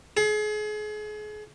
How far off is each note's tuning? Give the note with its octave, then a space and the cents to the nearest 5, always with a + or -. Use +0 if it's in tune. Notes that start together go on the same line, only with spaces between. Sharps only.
G#4 +35